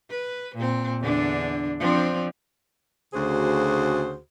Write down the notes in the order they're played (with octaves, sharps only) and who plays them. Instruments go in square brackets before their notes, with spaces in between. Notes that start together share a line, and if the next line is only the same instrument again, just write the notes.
[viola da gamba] B4
A#2 C4
E2 D3 D4
F3 C4 D4
[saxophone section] D2 C#3 F#4 G#4 C5